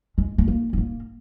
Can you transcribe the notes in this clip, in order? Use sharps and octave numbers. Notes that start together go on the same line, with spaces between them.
G#3
A3
A#3
B3
A#3